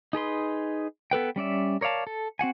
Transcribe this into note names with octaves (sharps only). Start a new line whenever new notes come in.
D#4 G#4 B4 C6
B3 A4 B4 G5
G3 C#4 D5 E5
A#4 C#5 D5 F5 A5
A4
C4 F#4 F#5 G#5